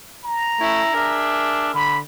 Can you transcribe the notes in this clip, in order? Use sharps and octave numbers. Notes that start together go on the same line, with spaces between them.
A#5
A3 C#4 E4
D4 G#4 A#4 E5
D3 B5